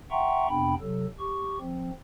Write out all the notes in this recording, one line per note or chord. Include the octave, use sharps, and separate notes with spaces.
E5 F#5 G5 A#5 C6 C#6
F2 C3 B3 D4 G5 B5
C3 F#3 A4
G4 C#6
F3 C4